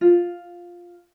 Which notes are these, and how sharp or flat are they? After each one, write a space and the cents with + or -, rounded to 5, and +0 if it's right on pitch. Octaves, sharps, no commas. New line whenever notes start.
F4 +5